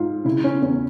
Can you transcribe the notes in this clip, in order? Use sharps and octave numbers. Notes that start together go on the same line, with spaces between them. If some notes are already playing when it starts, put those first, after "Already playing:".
Already playing: G#2 F4
C#3 E4
C#4
E2 C#4